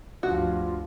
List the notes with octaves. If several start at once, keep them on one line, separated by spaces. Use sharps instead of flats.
D2 G2 F3 F4 F#4